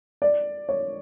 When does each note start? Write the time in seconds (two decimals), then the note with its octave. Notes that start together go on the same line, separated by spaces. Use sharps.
0.22 D5
0.69 C#5